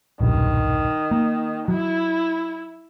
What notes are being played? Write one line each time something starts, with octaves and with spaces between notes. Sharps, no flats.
D#1 B1 G2 D#3
A#3
F#3 E4